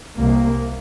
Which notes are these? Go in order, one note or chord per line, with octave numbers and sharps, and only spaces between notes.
C2 C3 A#3